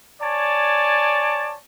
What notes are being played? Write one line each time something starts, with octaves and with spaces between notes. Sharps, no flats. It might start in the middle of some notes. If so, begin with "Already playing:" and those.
C#5 D5 G#5 A5